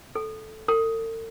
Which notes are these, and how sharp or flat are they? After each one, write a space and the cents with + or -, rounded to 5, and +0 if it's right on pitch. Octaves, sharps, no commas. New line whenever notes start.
A4 -10
A4 +45